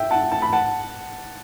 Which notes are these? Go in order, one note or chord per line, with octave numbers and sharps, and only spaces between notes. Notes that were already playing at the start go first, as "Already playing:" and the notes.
Already playing: E5 G5
F#5 A5
A5
B5
F#5 A5